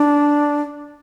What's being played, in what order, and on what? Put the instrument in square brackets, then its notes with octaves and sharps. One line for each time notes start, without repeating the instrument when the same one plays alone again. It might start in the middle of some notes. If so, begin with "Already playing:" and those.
Already playing: [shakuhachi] D4